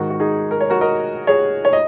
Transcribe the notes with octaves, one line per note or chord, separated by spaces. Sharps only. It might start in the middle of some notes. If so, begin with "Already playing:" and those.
Already playing: G#2 D#3 G#3 F#4 A#4
F#4
D#4 G#4
A#4
C#5
F#4 A#4
A#4 D#5
G#4 C#5
C#5
D#5